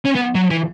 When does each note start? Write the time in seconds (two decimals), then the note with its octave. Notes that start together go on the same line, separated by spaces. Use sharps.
0.05 C#4
0.15 B3
0.35 F#3
0.50 E3